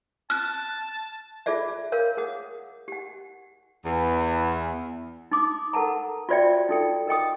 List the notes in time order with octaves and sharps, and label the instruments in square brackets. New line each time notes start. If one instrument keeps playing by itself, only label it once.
[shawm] A5 [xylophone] F6 F#6
[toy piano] F4 G#4 A4 D5 E5
A#4 C#5 F5
G#4 F#5 D#6
G4 F#5
[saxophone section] E2
[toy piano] D#4 D6 D#6
A4 A#4 F#5 A5 A#5
F4 F#4 C5 D5 E5 G5
D#4 A4 G5
A#4 D#5 G5 D#6